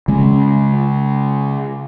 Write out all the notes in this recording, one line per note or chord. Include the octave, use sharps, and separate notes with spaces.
C#3 G#3 C#4